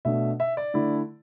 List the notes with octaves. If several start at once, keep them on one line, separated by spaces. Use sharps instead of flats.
B2 A3 D4 E5
E5
D5
D3 A3 E4